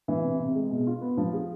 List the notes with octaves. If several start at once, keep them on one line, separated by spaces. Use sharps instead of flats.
E3
C3
C3
G#3
B2
F4
B3
F3
G#4